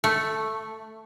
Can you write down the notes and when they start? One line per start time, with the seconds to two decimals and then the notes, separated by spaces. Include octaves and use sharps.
0.04 A3